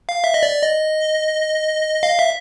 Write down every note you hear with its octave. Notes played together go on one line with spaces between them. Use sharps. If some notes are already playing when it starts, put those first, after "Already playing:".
F5
E5
D#5
D5
D#5
F5
E5